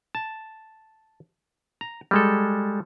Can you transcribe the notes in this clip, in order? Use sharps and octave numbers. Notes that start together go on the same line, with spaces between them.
A5
A#5
G3 G#3 A4